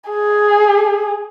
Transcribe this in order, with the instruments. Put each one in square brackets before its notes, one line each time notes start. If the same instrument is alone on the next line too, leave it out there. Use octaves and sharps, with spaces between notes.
[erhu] G#4